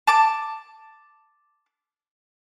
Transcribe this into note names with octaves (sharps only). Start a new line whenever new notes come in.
A5 D6